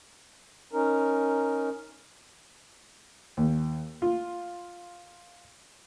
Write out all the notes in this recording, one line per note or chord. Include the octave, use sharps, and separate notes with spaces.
C#4 D#4 A#4
D#2
F4